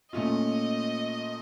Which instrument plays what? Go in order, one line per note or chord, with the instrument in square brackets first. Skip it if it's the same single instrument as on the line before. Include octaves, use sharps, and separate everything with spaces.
[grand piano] A#2 A3 C#4 F4 [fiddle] D#5